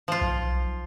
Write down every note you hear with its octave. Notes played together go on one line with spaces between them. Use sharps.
F3 F4
B1